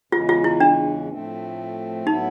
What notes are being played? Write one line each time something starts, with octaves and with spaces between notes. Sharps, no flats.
E2 C#3 E3 G#3 C#4 F4
F4
E4
D4
A2 F3 A3 C4
A2 F#3 B3 D#4 E4